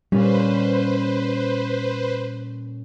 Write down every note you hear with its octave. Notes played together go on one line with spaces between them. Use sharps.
A#2 G3 C#4 B4 C5